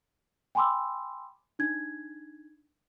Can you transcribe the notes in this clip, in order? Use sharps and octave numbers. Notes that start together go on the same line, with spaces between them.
G5 G#5 B5 C6 D6 E6
D4 D#4 G#6